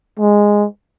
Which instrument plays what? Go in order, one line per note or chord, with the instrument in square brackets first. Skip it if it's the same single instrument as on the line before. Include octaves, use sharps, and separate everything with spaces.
[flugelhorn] G#3